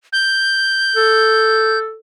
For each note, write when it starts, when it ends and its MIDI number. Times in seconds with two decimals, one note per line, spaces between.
0.13 1.79 91
0.96 1.96 69